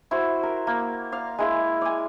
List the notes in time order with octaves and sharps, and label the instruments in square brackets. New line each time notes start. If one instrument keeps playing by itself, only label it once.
[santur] E4 F#4 C5
A#4
A#3
D5 F5
G#3 E4 F5
D5 G#5